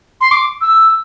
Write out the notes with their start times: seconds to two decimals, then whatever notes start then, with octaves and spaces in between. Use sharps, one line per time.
0.21 C6
0.31 D6
0.61 E6